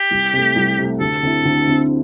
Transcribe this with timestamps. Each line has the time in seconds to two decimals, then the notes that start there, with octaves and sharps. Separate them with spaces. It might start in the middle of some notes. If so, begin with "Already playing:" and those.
Already playing: G4
0.11 C2
0.33 C3 A3
0.56 C2
0.78 C3 A3
1.00 D2 A4
1.23 D3 C4 E4
1.45 D2
1.67 D3 C4 E4